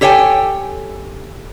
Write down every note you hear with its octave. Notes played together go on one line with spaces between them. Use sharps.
G4 A4 C#5 E5 G5 G#5